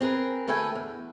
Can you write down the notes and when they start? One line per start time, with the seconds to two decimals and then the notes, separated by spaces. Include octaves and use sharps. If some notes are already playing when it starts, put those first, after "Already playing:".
0.01 C4 G#4 A#4 B4
0.47 D2 A3 A4 B4 G5 G#5
0.75 E2